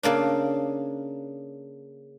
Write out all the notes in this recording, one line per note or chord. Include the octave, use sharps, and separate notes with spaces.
C#3 A#3 D4